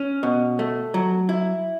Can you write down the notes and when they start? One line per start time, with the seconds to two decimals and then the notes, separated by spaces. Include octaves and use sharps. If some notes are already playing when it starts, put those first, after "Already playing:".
Already playing: C#4
0.23 B2
0.59 A3
0.94 F#3
1.29 E4